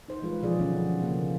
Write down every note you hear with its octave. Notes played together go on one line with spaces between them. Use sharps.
D#4 C5
E3 G#3 F4 B4
B2 F3 F4 G#4 C5 D5
D3 F#3 B3 C#4 G#4
F3
C#3 A#3